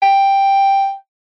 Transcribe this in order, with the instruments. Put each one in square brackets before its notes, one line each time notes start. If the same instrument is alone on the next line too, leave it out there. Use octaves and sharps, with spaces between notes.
[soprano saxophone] G5